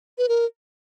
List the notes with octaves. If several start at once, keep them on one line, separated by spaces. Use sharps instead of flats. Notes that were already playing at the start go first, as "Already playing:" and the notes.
B4
A#4